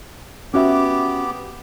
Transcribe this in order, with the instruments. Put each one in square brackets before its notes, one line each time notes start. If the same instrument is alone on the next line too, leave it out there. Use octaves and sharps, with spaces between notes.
[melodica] B3 G4 D6 [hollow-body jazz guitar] C#4 F#4 E5